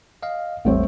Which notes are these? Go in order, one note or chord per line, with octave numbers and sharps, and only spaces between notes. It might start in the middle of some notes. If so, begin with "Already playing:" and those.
D#5 F5
A1 E2 G3 A3 C4 C#5